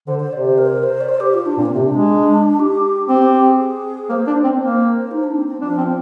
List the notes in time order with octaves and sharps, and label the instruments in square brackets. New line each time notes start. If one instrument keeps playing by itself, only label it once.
[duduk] D3 [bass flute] C5
[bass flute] C5
[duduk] C3 [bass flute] D5
[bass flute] C5
A#4
C5
D5
C5
G4
F4
D4
[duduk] A#2 [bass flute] C4
[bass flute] A#3
[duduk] C3 [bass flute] C4
[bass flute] D4
[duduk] G#3
[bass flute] G4
[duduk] C4 [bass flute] G4
[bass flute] G4
G4
G#4
[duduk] A#3 [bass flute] C5
[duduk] D4
C4
[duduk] A#3 [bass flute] C5
[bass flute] D#4
D4
C4
C4
[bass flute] F3 [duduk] D4
[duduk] C4